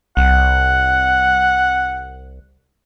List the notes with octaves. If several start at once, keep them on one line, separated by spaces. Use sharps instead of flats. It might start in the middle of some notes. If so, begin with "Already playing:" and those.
C2 F#5